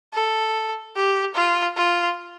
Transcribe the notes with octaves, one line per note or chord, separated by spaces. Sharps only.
A4
G4
F4
F4